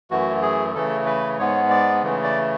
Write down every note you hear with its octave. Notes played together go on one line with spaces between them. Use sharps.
F#2 E3 A3 F#4
G#4
C#3 E3 A3 A4
B4
G#2 G#3 B3 C#5
D5
C#3 E3 A3
D5